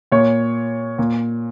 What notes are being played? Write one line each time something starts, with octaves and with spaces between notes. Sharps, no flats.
A#2 C#5
A#2